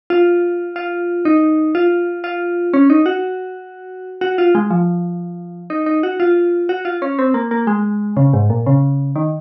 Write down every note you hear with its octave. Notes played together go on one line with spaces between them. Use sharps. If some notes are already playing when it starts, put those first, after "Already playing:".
F4
F4
D#4
F4
F4
C#4
D#4
F#4
F#4
F4
G#3
F3
D#4
D#4
F#4
F4
F#4
F4
C#4
C4
A#3
A#3
G#3
C#3
G#2
A#2
C#3
D#3